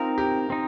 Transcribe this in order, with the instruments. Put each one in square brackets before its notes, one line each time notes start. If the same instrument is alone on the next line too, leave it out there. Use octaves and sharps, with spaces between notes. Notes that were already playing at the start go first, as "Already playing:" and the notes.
Already playing: [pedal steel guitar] C4 D#4 A#4 [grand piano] F4
[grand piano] G4
[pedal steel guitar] C4 D#4